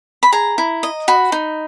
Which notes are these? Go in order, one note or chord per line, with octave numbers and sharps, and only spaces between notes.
B5
G#4 A#5
E4
D#5
F#4 B5
D#4